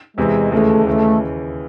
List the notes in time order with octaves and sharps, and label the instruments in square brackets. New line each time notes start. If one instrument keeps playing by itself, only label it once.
[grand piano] E2 C3 E3 [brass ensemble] G#3
[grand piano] D#2 C#3 E3 G#3 [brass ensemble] A3
[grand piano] D#2 C#3 E3 [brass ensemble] A3